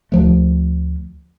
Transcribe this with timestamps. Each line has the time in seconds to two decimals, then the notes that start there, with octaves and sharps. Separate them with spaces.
0.12 D2 F3 A3